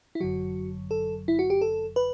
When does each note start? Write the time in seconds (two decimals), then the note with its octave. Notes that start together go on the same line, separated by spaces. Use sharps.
0.15 E4
0.20 G1 F#2 D3 F#3 F#4
0.91 A4
1.28 E4
1.39 F#4
1.50 G4
1.61 A4
1.96 B4